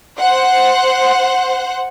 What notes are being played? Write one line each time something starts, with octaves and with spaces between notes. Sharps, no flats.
C5 F#5